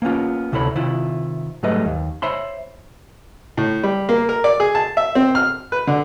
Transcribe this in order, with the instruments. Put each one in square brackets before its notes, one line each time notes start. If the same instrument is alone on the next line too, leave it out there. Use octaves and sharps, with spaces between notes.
[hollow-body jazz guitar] A#3 B3 C#4 F4
D2 C3 E4 A4 C#5 B5
C3 D#3 E4 F4
G#2 F#3 G3 A3 B4 D#5
D#2
C5 C#5 E5 B5 C6
[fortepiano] A2
G3
A#3
A#4
D5
G#4
A5
E5
C4
F6
B4
D3